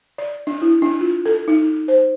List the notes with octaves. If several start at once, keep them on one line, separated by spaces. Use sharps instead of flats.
D5
D4
E4
D4
F4
A4
D#4
C5